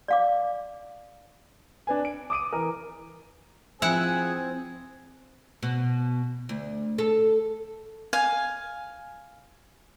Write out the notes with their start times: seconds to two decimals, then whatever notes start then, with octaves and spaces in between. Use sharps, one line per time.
0.08 D5 F5 D6
1.87 D4 B4 G#5
2.05 D7
2.30 D6 D#6 D7 D#7
2.53 E3 A#4
3.82 F3 C4 E4 G#4 F#5 G#5
5.63 B2
6.49 D2
6.98 A4
8.13 F5 G#5